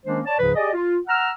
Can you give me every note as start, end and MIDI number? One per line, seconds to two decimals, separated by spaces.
0.05 0.20 51
0.05 0.20 56
0.05 0.20 58
0.05 0.20 61
0.05 0.20 62
0.05 0.20 72
0.26 0.38 73
0.26 0.38 74
0.26 0.38 81
0.39 0.52 37
0.39 0.52 44
0.39 0.52 49
0.39 0.52 53
0.39 0.52 71
0.55 0.73 67
0.55 0.73 68
0.55 0.73 74
0.55 0.73 75
0.73 0.97 65
1.07 1.31 78
1.07 1.31 82
1.07 1.31 88
1.07 1.31 89